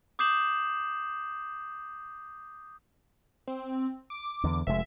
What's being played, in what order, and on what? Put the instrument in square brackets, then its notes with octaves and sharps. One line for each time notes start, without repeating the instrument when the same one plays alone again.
[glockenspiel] D6 D#6 G6 C7 E7 F#7
[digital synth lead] C4
D6
[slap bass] E2 D3
[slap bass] F1 G#3 [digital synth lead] E5